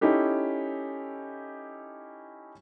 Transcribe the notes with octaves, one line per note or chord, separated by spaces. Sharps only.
C#4 D#4 E4 G4 A4